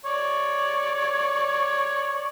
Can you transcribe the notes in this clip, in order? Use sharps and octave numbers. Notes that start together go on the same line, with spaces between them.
C#5 D5